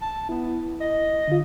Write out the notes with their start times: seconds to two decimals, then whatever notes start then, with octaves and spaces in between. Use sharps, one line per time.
0.02 A5
0.29 B3 E4
0.81 D#5
1.28 D3 F4